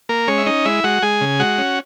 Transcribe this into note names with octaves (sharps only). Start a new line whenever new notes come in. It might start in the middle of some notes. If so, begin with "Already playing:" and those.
A#3 A#4
G#3 C#4 C#5
E5
C#4 D#4 D#5
G#3 E4 E5
G#3 F#4 F#5
G#3 G#4 G#5
C#3
G#3 F#4 F#5
C#4